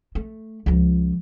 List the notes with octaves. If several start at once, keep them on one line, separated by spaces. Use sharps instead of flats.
A3
C#2 F3